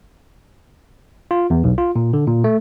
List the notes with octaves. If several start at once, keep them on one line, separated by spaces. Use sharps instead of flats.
F4
E2
B1
F4
A#2
D3
A#2
A3